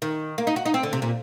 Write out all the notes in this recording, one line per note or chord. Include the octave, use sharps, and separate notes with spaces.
D#3
A#3
D#4
F#4
D#4
C4
D3
C3
A#2